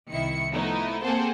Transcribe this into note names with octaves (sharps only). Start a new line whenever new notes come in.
C2 D#3 E4 C#7
F3 A3 B3 D#4 E4
A#3 C4 G#4 A4 C5 F#5